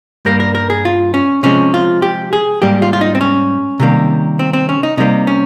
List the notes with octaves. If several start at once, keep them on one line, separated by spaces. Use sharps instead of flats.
G2 G3 A#3 A#4
A#4
A#4
G#4
F4
C#4
C3 F3 G#3 C#4
F4
G4
G#4
G#2 G3 A#3 G4
F4
F4
D#4
C4
C#4
C3 D#3 G3 A#3
C4
C4
C#4
D#4
C3 G3 A#3 D#4
C#4